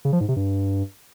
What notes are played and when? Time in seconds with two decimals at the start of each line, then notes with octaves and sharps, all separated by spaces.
0.05 C#3
0.13 F3
0.21 G#2
0.28 C3
0.36 G2